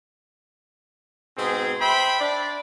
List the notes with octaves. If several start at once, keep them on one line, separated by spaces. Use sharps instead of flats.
G#2 B2 C4 G#4
C5 E5 G5 B5 C6
D4 D5